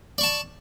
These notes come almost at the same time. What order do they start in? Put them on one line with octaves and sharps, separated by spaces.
D5 C#6 A5